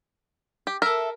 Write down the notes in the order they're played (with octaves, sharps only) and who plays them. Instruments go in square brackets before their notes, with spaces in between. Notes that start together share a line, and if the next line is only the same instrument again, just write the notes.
[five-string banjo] G4
[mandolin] A4 E5 [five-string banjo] A#4